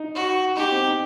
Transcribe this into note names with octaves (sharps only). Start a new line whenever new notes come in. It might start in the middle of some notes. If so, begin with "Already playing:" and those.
Already playing: D#4
F#4
D#4 G4
C4
D#4